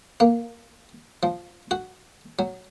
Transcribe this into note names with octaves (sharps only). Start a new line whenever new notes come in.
A#3
F3
F#4
F#3